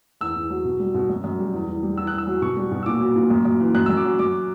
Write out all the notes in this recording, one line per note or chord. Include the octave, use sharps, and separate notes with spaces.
E2 E6
E2
F#3
B2
G3
B2
F#2
F#2
G3
E2
E2
G3
E2 E6
F#6
E2
E6
F#3
B2 C#6
G3
B2
E6
A#2 D6
F#3
A#2
F#2
F#2
E3
F#2 F#6
E6
F#2
D6
F#3
F#2 D6